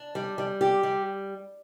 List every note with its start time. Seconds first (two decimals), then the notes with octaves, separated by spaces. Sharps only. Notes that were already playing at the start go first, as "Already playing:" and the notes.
Already playing: D4
0.15 G3
0.38 G3
0.61 G4
0.83 G3